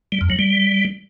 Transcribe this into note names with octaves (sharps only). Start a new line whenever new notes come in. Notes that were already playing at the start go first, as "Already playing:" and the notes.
G3
F2
F#3
G3